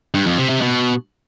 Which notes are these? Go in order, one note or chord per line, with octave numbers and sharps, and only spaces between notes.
G2
F2
C3
C3
B2